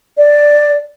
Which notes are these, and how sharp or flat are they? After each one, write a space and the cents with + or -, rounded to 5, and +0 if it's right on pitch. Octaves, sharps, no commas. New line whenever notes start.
D5 +5